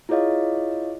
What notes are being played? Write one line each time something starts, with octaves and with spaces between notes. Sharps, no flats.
E4 F4 G#4 C#5 D#5 F5